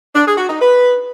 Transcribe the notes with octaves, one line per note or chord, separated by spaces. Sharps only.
D4
G#4
F#4
D#4
B4